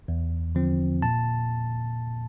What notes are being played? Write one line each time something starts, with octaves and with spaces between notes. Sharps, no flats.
E2
D3 F3 C4
A#2 A5